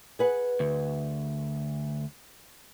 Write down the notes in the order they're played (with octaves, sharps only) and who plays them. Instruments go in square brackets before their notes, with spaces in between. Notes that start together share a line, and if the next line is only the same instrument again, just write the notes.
[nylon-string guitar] G#4 B4 F#5
[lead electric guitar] D2